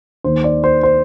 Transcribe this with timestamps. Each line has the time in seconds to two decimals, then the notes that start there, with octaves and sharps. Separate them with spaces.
0.24 D#2 D#3 C5
0.44 D5
0.64 C5
0.83 C5